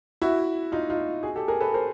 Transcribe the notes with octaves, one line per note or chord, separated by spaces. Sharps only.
E4 F#4
D#4 F4
D#4 F4
F#4 G#4
G4 A4
G#4 A#4
A4 B4
A#4 C5